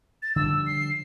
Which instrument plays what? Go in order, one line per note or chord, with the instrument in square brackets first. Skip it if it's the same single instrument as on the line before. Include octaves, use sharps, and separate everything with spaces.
[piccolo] A6
[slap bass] D3 F3 G3 [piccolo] E6
[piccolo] C7